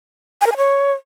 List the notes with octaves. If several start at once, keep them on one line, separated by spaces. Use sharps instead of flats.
G#5
A#4
G#5
C#5